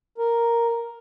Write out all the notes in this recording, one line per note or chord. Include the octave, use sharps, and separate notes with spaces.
A#4